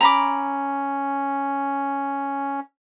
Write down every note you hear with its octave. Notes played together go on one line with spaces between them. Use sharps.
C#4 A#5 B5 D6